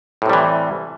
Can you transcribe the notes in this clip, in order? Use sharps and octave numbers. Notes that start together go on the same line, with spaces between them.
A2 C3 E3 G3